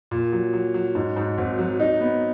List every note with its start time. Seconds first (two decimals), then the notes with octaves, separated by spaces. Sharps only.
0.11 A#2
0.33 F#3
0.53 F#3
0.74 F#3
0.95 G#2
1.16 G#2
1.38 G#1
1.58 F#3
1.80 D#4
2.01 B3